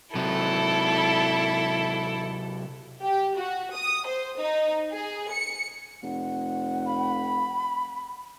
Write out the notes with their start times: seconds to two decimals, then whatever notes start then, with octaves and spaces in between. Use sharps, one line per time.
0.15 C3 F#3 E4 A4
3.02 G4
3.37 F#4
3.75 D#6
4.06 C5
4.39 D#4
4.92 G#4
5.31 C#7
6.03 F1 F#5
6.86 B5